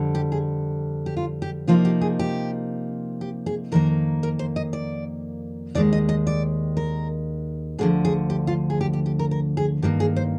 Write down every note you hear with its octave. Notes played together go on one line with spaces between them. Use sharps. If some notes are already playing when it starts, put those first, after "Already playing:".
Already playing: F2 D3 G3
G4
G#4
G4
F4
G4
C3 F3 A#3 D#4 F4
G4
G#4
G4
G4
G#4
F2 D#3 A#3 A#4
A#4
C5
D#5
D5
D#2 D#3 G#3 D5
D#5
D#5
D5
A#4
D2 D3 F3 G#4
G#4
G4
F4
G#4
G4
G4
G4
A#4
A#4
G#4
G2 D#3 A#3 G4
G#4
C5